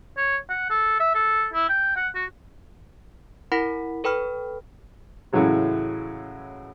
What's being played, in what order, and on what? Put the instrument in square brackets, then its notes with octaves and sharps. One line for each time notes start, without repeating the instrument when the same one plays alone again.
[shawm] C#5
F#5
A4
E5
A4
E4
G5
F#5
F#4
[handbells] E4 A#4 F#5 B5 B6
A4 B4 G5 B5 F6
[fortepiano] A2 C#3 E3 F#3 G#3